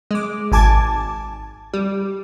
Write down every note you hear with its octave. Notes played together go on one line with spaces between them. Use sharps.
G#3 D6
G#1 G#5 A5 D6 G#6
G3